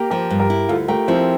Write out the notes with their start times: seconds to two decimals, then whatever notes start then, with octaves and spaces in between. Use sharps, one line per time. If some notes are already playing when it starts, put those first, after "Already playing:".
Already playing: A#3 G4 A#4
0.11 F3 G4 A#4
0.30 G2
0.40 G4 A#4
0.50 E4
0.69 D2 F4 A4
0.88 A3 G4 A#4
1.08 F3 C4 E4